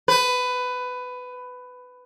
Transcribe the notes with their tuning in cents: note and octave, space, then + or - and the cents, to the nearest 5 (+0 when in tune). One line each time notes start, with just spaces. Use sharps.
B4 +15